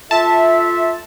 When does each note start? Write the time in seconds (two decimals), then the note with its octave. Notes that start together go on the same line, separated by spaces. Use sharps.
0.11 F4 A4 E5 A5